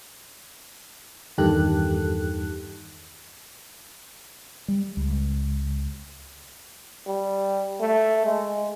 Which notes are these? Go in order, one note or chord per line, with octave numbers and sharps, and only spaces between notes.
E2 G2 D#3 G4 A4 F#6
G3
C#2
G3
A3
G#3